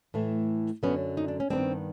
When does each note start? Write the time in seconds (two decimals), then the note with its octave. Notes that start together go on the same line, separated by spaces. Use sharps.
0.14 A2 E3 A3
0.83 F#2 D3 F#3 A3 B3 C#4
1.17 D#4
1.28 D4
1.40 C#4
1.50 G2 D#3 G#3 B3 C4 D4